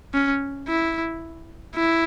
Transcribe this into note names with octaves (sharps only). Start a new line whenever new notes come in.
C#4
E4
E4